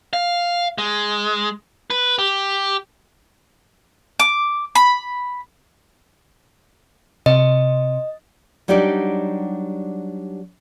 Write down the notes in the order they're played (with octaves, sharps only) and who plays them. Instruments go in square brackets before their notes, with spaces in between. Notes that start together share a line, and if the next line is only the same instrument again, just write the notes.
[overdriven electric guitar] F5
G#3
B4
G4
[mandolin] D6
B5
[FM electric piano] C3 [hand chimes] D#5
[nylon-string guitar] F#3 G3 D4 D#4 G4 D5